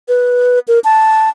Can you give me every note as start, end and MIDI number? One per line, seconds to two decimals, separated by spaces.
0.08 0.59 71
0.68 0.79 70
0.84 1.29 81